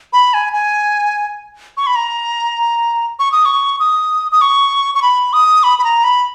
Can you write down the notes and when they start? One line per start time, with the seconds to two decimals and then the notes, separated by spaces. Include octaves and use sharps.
0.13 B5
0.34 G#5
0.53 G#5
1.77 C#6
1.87 B5
1.96 A#5
3.19 C#6
3.32 D#6
3.45 C#6
3.80 D#6
4.32 D#6
4.41 C#6
4.95 C#6
5.02 B5
5.33 D#6
5.63 B5
5.79 B5
5.84 A#5
6.04 B5